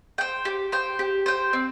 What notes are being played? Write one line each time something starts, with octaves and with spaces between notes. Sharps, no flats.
C5 G5
G4
C5 G5
G4
C5 G5
C4